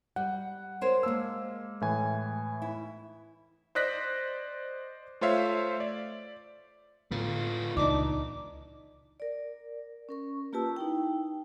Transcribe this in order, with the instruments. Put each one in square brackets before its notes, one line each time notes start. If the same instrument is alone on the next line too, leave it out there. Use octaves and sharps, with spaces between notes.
[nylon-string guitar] G3 [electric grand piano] F#5
[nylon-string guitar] A#4 C5 C#5
[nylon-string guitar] G#3 A5 [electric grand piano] A#3 E6
[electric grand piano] A2 E3 G#5
[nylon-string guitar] E4
[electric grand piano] C5 D5 D#5 F#6 A#6 B6
A3 F4 C5 C#5 E5 F5
D5
[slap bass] A2 D3 [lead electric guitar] B3 F4
[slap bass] C#2 A#2 E3 [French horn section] D4 D#4 [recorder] D6
[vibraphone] A#4 D5
C#4 A#4 C#6
A#3 F4 G4 B4 A5 E6
D#4 E4 G5